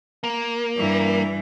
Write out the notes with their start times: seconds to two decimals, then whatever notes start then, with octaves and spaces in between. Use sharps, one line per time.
0.24 A#3
0.76 G2 E3